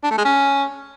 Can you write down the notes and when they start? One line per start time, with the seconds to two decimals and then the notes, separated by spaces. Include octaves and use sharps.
0.04 D4
0.11 A3
0.18 G#3
0.25 C#4